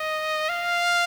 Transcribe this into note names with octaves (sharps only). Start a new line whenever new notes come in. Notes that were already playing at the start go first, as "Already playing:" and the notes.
Already playing: D#5
F5